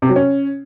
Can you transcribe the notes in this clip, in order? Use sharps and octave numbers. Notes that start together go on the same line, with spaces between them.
C3
F#3
C#4